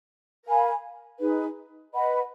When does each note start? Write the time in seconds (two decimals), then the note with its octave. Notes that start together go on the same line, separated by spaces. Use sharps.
0.45 A#4 F5 G#5 B5
1.19 D#4 G#4 B4
1.93 B4 D#5 F#5 B5